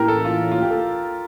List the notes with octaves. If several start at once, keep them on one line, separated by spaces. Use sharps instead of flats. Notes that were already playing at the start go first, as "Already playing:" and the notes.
Already playing: A2 E3 A#3 C#4 E4 G4 A#4
A4
F4
F4
G4
A4